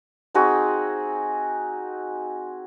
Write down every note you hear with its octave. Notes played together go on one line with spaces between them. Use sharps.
C4 D#4 F#4 G#4